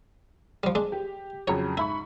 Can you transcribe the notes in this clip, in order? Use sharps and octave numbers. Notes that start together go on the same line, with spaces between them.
F3 G3
G#3 D4
G4
F2 C#3 F#3 C#5
G#2 E4 B5 C#6